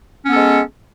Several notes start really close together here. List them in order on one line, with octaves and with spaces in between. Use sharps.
C#4 B3 A4 G#3